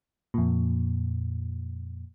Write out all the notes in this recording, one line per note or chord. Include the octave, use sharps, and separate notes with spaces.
F2 A#2